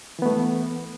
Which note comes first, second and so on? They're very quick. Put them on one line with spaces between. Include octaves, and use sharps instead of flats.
E3 B3 A3